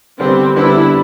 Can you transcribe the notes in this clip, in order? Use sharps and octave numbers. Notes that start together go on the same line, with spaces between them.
D3 G3 B3 C4 D4
D3 G3 B3 D4 E4